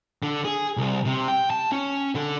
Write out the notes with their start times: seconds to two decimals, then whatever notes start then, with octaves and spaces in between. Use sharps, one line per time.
0.23 D3
0.45 G#4
0.77 C2
1.05 C3
1.28 G5
1.50 A5
1.72 C#4
2.15 D3